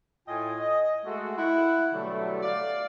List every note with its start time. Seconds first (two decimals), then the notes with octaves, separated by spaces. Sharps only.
0.28 A2 F4 D#5 G5 G#5
0.60 D#5
1.05 G#3 A3 F#4
1.37 E4 F#5
1.93 B2 D3 F#3 G3 A3
2.42 D5 F5